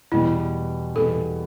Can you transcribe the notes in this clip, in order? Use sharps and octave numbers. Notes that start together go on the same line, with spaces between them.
E2 B2 G3 B3 E4
E2 B2 G3 B3 A4